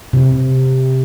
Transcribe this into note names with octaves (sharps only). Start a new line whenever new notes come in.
C3